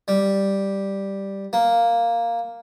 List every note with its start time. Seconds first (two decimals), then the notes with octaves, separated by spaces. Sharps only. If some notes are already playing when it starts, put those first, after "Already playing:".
0.08 G3
1.53 A#3